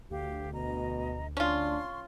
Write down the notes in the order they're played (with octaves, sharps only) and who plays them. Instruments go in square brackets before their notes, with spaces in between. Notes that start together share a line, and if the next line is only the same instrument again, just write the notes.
[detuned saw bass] D2 [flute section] G4 F5
[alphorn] B2 [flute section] D#5 A#5
[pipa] C#4 F4 [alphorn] D4 [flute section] C6 C#6